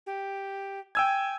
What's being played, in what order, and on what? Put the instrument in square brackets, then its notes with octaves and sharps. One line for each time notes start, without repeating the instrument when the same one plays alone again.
[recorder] G4
[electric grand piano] G5 E6 G#6 [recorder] G#5